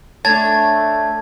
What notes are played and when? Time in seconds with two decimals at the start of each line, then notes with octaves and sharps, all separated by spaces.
0.25 A3 D4 C#5 A5 G#6 A6